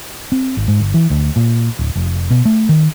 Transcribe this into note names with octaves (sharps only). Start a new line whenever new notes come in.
C4
G#1
G#2
G1
E3
D2
A#2
D1
F1
B2
A3
D#3